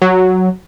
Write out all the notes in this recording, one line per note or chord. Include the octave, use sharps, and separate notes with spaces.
F#3